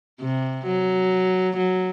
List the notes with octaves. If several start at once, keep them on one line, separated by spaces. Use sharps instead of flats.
C3
F#3
F#3